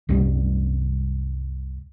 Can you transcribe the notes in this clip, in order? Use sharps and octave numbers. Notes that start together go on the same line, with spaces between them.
C2 F#2 C3 G3